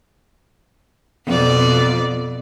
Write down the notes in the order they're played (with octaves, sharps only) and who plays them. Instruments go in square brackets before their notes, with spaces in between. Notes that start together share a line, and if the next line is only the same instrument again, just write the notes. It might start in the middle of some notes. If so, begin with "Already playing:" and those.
[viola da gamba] F2 B2 D5